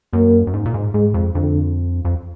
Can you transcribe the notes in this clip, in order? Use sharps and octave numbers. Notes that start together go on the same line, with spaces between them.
F#2 A#3
F#2
G#2
A#2
G#2
G#2 G#3
F2
F2 D3
F2